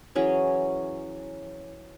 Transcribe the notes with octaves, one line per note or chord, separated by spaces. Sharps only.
E3 F#3 C#4 G#4